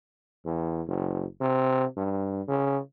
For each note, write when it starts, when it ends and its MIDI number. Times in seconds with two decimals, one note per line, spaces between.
0.45 0.81 40
0.88 1.24 30
1.41 1.84 48
1.97 2.42 43
2.48 2.78 49